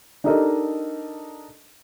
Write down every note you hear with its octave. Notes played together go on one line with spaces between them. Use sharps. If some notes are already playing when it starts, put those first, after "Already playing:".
D4 D#4 G4 A4 A#4 D#5